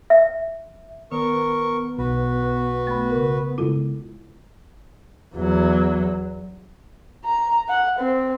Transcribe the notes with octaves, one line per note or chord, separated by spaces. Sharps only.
E5
D#3 B3 A#4 C#6
B1 F#4 B4
A3 B5
C#3 A#4
C#3 G#3 B3 E4 F4 A4
E2 F#3
A#5
F#5
C4